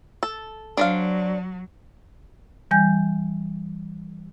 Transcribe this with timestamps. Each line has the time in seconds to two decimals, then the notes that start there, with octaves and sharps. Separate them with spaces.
0.23 A4
0.77 F#3 D4 C5 F5
2.71 E3 G3 G#5 G6